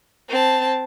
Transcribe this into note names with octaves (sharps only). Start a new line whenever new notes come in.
C4 A5